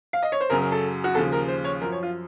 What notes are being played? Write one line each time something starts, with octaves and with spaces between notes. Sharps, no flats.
F5
D#5
C#5
C5
F#2 C#3 F#3 A#4
A#4
A4
F#4
D#2 C#3 F3 A4
A#4
C5
C#5
F#2 F3 A#4
C#5
F4